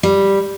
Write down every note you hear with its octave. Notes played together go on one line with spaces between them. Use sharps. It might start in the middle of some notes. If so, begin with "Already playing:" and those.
G3